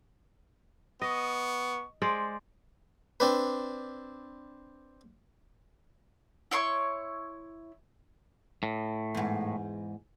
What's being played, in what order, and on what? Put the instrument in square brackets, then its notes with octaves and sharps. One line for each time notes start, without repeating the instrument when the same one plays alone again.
[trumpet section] B3 C#6 [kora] D#5
[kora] G#3 C5 D5
[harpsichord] C4 D4 B4
[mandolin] E4 C#5 C6 C#6
[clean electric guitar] A2
[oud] E2 G#2